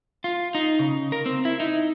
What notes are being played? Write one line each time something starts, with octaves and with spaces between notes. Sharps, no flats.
F4
D#4
C#3
A#4
C4
E4
D#4